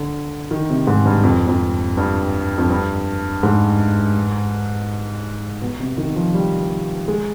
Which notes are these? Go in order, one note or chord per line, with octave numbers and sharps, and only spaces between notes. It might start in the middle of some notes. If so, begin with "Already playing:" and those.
Already playing: D3
D#3
C3
G#2
G2
F2
F2
G2
F2
G2
G#2
B2
C3
D#3
F3
G3
G#3